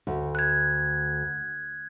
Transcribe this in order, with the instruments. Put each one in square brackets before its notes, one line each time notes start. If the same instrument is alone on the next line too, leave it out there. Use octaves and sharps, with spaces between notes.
[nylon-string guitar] D2
[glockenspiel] F#6 G#6